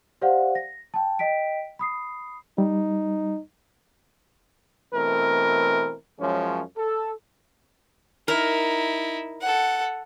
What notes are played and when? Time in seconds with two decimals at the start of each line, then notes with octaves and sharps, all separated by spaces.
0.22 G4 C5 D5 F5 F#5
0.55 A#6
0.94 G5 A5
1.19 D#5 G5 B6 D7
1.79 B5 D#6 C7
2.58 G3 D#4
4.93 B2 E3 A3 C4 A#4
6.19 F#2 F3 G#3 C#4
6.77 A4
8.28 D#4 E4 A#4
9.42 A4 F#5